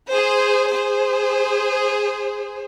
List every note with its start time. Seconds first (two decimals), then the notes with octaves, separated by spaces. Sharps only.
0.11 G#4 C5
0.72 G#4 C5